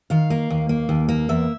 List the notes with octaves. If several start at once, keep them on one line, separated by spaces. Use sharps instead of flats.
D#3 F5
A#3
D#2
A#3
D#2
A#3
E2 E5